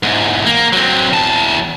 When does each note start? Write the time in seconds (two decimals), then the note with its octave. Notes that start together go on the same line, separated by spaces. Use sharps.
0.03 E2 G#2
0.46 A#3
0.73 F#3 C4
1.13 E2 A5